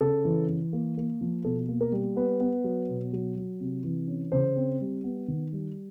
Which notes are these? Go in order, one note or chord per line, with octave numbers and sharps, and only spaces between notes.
C#3 A4
E3
E3
A#3
A#3
F3
B2 A4
A#3
A#4
G3
B3 B4
B3
F#3
B2
F#3
F#3
C3
E3
C#4
C#3 C5
C4
G3
B3
D#3
G3